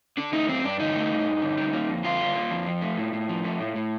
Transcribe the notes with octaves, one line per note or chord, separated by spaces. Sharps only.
D3 D4
A3 D#4
G2 C4
G2 D4
D3 D#4
A3
G2
G2
D3
G3
A#3
F2
D3 F4
G3
A#3
F2
F3
A3
A2
A2
F3
A3
A2
A2